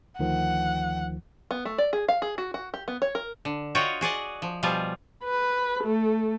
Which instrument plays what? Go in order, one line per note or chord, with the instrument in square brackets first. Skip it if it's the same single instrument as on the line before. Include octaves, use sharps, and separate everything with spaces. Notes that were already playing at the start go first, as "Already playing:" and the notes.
[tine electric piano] D2 D#3 F3 [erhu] F#5
[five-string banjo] B3
A3
D5
G#4
F5
G#4
F#4
F#4
G4
B3
C#5
A#4
[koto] D3
F4 F#4 C#5 D#5 G5
F#4 G#4 D5 D#5
F3
B2 F3 G3 F4 G#4
[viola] B4
A3